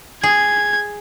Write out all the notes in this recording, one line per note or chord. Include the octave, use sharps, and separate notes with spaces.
G#4 G#6